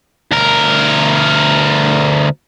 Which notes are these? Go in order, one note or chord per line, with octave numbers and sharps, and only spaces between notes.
D2 A#4